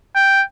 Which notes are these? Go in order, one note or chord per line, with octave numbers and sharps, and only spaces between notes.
G5